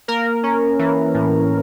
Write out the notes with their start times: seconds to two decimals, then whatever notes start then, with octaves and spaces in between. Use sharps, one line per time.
0.08 A#3 A#4
0.43 C#4
0.79 E3
1.14 A2